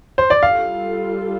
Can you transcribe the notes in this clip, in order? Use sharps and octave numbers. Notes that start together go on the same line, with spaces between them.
C5
D5
G3 F4 A4 F5